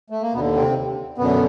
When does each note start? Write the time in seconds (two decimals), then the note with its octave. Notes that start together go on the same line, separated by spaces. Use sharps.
0.10 A3
0.22 A#3
0.33 D#2 B2 D3 B3
0.55 C3 C4
1.18 F#2 B2 D3 B3